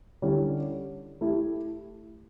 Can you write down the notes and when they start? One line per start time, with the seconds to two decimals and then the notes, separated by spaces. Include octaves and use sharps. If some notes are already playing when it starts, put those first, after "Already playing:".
0.22 D3 G3 C#4 E4 G4
1.21 A3 E4 G4